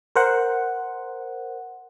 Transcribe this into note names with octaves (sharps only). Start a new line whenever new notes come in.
A#4 C5 F#5